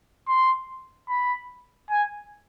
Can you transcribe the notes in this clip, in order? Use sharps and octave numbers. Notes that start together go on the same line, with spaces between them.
C6
B5
G#5